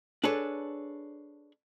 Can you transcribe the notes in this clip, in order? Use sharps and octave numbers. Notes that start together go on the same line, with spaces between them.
D4 G#4 A4 B4 C#5